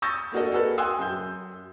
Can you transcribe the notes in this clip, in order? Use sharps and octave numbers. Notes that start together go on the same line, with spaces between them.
C#6 D#6 E6 G6 A6 A#6
A#3 D4 F#4 A4 D#5
A#3 F#4 G#4 A4 B4
G5 G#5 C6 D#6 E6 F#6
F#2 G6